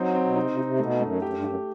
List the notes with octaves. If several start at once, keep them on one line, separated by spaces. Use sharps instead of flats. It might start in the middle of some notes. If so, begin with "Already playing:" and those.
Already playing: F#3 C4 D#4
C4
B2
C3 D#4
C3
D#4
C3
B2 A3
F#2 A3
F#2 G4
G2
F#2 G4